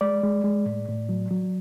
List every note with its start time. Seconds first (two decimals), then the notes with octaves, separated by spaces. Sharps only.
0.01 G#3 D5
0.23 G#3
0.44 G#3
0.66 A2
0.88 A2
1.09 F#3
1.30 F#3